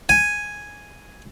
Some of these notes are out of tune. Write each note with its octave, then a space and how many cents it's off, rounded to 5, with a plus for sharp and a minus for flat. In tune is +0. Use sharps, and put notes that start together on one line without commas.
G#5 +0